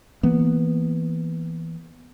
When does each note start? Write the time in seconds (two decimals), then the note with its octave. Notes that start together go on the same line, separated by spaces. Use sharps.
0.23 E3 A#3 B3